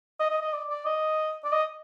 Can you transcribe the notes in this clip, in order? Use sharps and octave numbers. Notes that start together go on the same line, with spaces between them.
D#5
D#5
D#5
D5
D5
D#5
D5
D#5